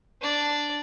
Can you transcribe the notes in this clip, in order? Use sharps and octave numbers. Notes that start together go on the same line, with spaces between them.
D4 D5